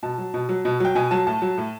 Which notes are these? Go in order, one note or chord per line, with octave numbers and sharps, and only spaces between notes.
B2 A5
F#3
B2
F#3
B2
F#3 G5
B2 G#5
F#3 A5
A2 A5
F#3
A2